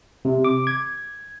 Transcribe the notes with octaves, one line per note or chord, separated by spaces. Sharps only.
C3
D6
G#6